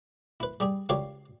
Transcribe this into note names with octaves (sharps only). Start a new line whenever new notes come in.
E4 B4
G3 G4 G#4
C#2 G4 C#5 D5 F5